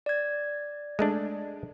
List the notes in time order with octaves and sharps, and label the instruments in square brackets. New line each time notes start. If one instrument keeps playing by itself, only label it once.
[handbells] D5 G#6
[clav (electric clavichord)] G#3 A3 D4